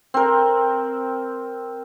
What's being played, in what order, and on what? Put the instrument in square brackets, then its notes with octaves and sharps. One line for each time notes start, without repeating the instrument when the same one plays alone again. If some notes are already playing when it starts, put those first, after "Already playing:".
[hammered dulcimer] C4 A#4